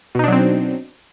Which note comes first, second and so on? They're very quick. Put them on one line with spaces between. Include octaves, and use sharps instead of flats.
B2 D#4 D4 F#3 C4